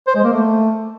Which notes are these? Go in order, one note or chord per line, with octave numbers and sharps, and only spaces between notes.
C5
G#3
A#3
A3